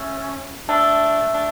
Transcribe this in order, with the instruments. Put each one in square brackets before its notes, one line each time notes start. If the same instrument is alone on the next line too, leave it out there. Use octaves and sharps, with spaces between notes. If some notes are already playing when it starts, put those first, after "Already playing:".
Already playing: [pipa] A3 [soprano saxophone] C#4
[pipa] A3 [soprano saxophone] D4
[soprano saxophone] D4